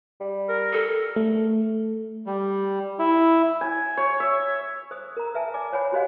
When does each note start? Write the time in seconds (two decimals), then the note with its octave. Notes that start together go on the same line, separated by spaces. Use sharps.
0.20 G3
0.49 A#4
0.73 A4
1.16 A3
2.26 G3
2.99 E4
3.61 G#5
3.97 C#5
4.20 E5
4.91 C5 D#6
5.17 A#4 A#5
5.34 B4 E5 G#5 A5
5.54 D5 G#5 D6
5.73 C5 C#5 F#5 G#5 B5
5.92 F#4 G4 C5 D#5 F5 F#5